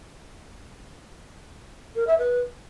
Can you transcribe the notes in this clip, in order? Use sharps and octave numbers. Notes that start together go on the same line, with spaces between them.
A#4
E5
B4